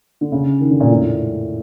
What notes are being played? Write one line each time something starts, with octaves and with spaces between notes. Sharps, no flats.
D3
C#3
D#3
D3
A#2
A2